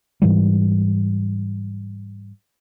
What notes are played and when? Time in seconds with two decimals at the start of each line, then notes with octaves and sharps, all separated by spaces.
0.22 G#2 E3 G3